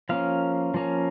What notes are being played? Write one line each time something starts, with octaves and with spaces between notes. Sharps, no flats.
F3 A#3 C#4 F5
F3 A#3 C#4